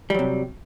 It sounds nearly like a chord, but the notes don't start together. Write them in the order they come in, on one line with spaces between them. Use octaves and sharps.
G3 F#3 C3